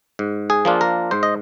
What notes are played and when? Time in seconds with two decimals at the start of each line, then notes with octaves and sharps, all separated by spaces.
0.19 G#2
0.50 G#4
0.65 F3 A#3 D4 F4
0.81 A#4
1.11 G#2 C5
1.23 D#5